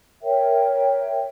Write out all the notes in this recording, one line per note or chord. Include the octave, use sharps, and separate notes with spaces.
A#4 C#5 E5 G5